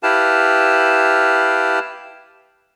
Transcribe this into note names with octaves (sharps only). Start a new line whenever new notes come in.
E4 G4 B4 F5 A5